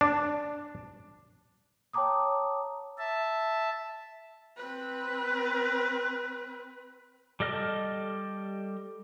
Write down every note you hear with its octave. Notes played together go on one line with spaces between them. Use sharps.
D4
C#5 G5 A5 A#5 D6 D#6
E5 A5
C4 B4
G3 A4 D#5 F6